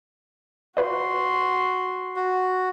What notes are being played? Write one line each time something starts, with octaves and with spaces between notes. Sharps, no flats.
F4 F#4 B4 D5 C6
F#4